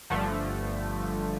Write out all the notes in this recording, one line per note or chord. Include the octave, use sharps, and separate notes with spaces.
G1 G2 D3 F3 A3